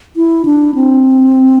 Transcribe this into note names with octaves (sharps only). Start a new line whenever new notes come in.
E4
D4
C4